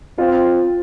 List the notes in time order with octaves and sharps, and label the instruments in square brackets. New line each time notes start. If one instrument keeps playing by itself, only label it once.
[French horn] C4 [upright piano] F4